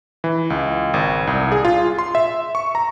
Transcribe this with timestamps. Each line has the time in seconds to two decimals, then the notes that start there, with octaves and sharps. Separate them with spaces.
0.24 E3
0.50 C#2
0.94 G#1
1.27 C2
1.52 G#4
1.65 F4
1.99 C6
2.15 E5
2.55 C#6
2.75 A#5